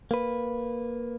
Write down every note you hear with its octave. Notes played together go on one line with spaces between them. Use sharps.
A#3 B4